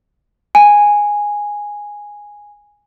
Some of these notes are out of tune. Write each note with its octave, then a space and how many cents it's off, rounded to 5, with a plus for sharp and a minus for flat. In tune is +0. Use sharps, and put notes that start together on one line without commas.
G#5 -5